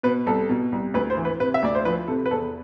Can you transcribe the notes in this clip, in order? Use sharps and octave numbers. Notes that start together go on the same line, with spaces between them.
B2 B4
C2 A4
B2
C2
D2 B4
C5
E3
B4
C3 B4
E5
D2 D5
C5
F3 B4
C3 A4
B4
E2 A4